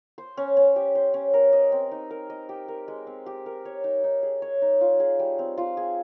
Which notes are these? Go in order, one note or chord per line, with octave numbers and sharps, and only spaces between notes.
C5
C#4
C#4
G4
C5
C#4
A#4
D#5
C4
D#4
A#4
D#5
G4
A#4
G#3
C4
G4
A#4
C#5
D#4
D#4
G#4
C#5
D#4
F4
G#4
G3
C4
F4
G#4